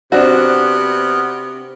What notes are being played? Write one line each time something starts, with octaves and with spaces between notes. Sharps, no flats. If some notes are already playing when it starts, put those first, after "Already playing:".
C3 B3 C4 D4 F#4 F6 F#6